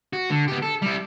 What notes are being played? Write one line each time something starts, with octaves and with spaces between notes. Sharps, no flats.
F#4
D3
B3 G4
A4
G3 E4